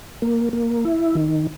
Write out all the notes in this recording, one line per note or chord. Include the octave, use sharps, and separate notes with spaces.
A#3
A#3
E4
D#3